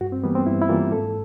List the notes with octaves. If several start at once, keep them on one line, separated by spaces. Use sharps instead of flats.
G2 F#4
C4
E3 G3 A#3 B3
C4
G2 E4
E4
E3 G3 A#3 F4
G#2 A4